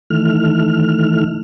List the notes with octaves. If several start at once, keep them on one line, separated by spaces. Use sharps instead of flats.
D#3 E3 A3 F6